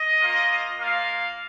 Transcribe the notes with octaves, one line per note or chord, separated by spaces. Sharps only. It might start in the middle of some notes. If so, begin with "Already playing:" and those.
Already playing: D#5
A#3 F4
A#3 F4 F5